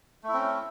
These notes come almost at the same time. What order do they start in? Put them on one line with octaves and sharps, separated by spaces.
A3 E4 C4 C#4